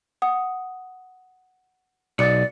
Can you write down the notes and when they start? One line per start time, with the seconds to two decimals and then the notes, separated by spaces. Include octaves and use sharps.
0.22 F#5 D#6
2.19 B1 D5 C#7